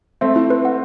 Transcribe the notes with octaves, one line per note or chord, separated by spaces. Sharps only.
A3 C4 E5
E4
B4
F#5